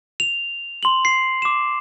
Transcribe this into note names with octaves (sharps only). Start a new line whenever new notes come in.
F7
C6 F#7
C7
D6 E7